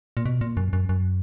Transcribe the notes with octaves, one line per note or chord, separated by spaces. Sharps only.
A#2
B2
A#2
F#2
F#2
F#2